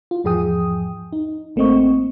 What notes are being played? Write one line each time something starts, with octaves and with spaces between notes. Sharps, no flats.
F4
E2 G#2 F3 G#4 G5 D#6
D#4
A1 A3 A#3 C4 D#5 C#6